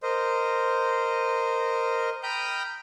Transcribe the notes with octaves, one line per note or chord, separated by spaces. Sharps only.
A#4 C5 D#5
G5 A#5 B5 D#6 F6 G6